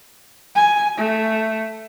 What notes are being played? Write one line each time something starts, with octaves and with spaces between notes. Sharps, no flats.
G#5
A3